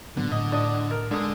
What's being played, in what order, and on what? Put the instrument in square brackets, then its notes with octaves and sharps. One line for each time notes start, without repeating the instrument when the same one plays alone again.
[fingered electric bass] A2 F#3 B3 [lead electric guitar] D3
[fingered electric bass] A2 [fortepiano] D#5
[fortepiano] D4 D#5
A#4
[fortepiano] D3 D#6 [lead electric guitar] G#3